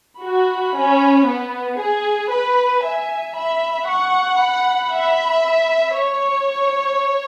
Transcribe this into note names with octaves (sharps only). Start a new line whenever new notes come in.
F#4 B5
C#4
B3
G#4 G#5
B4 B5
E5 G#5
E5 B5
F#5 C#6
B5
E5
C#5 C#6
C#6